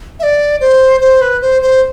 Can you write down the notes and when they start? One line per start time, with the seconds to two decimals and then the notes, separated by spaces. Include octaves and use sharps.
0.19 E5
0.23 D5
0.60 C5
1.01 C5
1.21 B4
1.41 C5
1.62 C5